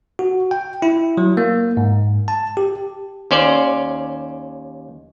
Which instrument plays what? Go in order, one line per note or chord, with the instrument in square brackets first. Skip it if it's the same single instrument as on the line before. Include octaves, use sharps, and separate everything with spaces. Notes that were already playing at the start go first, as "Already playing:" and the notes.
[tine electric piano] F#4
G5
E4
F#3
A#3
G#2
A5
G4
[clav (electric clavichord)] D#2 C#4 C5 D5